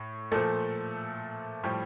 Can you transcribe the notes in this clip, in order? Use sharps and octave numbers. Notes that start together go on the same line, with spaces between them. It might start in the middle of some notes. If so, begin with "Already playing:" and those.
Already playing: A2
A#2 F3 A3 A4
A2 F3 G3 G4